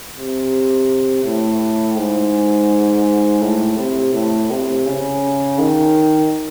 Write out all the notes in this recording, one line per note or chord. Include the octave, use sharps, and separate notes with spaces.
C3
A2
G#2
A2
C3
A2
C3
C#3
D#3